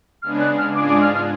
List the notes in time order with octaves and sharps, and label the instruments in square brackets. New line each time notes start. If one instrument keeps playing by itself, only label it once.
[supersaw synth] C#3 G#3 B3 D4 G#4 [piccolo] F6
[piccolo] F#6
F6
[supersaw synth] G#2 G#3 D4 F4 G#4 [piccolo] D6
[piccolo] D6
F6
F6